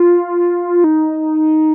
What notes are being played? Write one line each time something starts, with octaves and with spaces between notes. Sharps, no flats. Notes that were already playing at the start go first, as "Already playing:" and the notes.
Already playing: F4
D#4